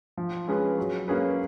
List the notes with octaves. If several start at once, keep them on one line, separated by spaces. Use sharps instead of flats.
F3
G#3 C#4 G#4 B4
F#3
A#3 C#4 G#4 B4